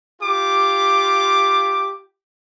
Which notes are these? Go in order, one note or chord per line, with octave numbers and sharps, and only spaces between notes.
F4 G4 D6